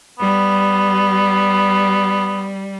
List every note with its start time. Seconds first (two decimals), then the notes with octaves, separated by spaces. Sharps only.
0.19 G3 B3